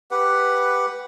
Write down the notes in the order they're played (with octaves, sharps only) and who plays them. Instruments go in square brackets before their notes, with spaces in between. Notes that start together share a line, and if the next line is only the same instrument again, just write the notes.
[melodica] G4 B4 F#5